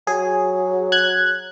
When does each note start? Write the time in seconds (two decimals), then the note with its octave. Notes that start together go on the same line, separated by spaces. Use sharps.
0.07 F#3 G#4
0.92 F#6 G#6